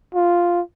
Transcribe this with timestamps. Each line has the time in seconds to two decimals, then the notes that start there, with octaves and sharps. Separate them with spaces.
0.15 F4